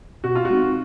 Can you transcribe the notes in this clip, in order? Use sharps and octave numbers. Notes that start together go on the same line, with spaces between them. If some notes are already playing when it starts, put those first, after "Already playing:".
B2 F#4
F4
F#4
G#3 C4 D#4